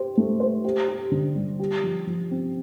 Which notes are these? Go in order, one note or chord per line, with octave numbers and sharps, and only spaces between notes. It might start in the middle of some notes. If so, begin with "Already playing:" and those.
Already playing: G4 C5
A3
C5
G4
G4
D3
G3
G4
F3
F3
C4